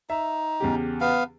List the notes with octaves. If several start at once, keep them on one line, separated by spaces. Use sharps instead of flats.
D#4 E5
E2 C#3 G4
B3 F5